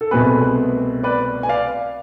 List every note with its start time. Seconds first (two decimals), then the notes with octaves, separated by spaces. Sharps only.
0.01 A4
0.11 C2 B2 A3 C4 G#4 B4
1.03 B4 D5
1.43 G#5
1.49 D5 F5